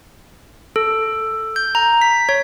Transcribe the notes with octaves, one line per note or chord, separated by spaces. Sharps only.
A4
G6
A#5
B6
C#5